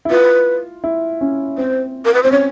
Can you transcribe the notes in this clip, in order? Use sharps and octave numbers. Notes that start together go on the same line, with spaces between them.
E4
F4 B4
E4
C#4
C4 C5
A#4
B4
C4 C5
C#4 C#5